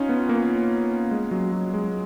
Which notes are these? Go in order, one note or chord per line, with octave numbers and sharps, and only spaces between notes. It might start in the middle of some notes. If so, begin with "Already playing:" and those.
Already playing: C#4 D#4 F4
B3
A#3
G#3
F#3
F#3
G#3